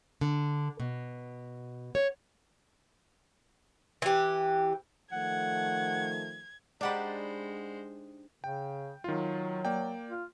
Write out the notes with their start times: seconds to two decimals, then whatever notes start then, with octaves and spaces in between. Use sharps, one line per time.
0.21 D3
0.80 B2
1.95 C#5
4.02 E3 G4
5.12 D#3 F3 A3 F#5 G#6
6.81 G#3 D4 D#4 G4 C5 D5 F#5 B5
8.44 C#3 G5
9.04 D#3 F#3 F4
9.65 A#3 D5 G5
10.09 F4